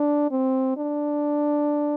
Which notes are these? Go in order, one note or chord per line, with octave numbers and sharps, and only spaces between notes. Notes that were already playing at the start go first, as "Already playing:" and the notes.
Already playing: D4
C4
D4